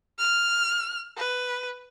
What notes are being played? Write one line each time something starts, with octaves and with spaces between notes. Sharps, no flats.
F6
B4